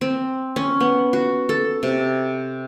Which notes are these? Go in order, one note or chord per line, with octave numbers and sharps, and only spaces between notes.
C4
C#4
B3
F#4
A4
C3